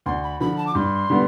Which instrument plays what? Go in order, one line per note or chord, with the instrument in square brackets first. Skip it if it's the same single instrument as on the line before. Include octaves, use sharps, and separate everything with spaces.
[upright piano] D2 [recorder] C6
[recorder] B5
[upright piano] D3 F3 [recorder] B5
[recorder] A5
D6
[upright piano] G2 [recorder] C6
[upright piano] D3 G3 B3